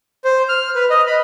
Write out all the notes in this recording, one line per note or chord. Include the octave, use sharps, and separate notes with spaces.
C5
F6
B4
D#5
B5